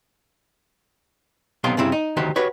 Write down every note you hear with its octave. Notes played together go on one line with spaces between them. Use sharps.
B1 C3 B3 F5 G5 C6
G2 C#3 C4 E4
D#4
D2 D#3 F#4 G4 C5
F#4 G4 B4 C#5